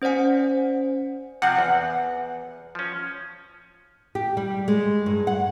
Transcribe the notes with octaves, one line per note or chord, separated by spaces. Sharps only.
C#4 C5 D5 F#5 G#5
C3 F3 C4 F#5
E2
F3 C#4
G4
G3
G#3
G2
F#5